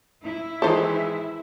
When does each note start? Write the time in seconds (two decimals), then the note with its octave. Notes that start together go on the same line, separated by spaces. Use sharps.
0.23 E4
0.62 D#3 E3 G#3 A4 C5